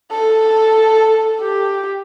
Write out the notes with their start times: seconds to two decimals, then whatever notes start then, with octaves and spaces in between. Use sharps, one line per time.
0.11 A4
1.41 G4